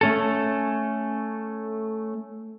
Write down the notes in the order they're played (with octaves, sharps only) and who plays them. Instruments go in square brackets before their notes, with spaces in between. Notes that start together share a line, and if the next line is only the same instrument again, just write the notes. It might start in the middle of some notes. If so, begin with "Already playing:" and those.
[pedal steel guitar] A3 C#4 A4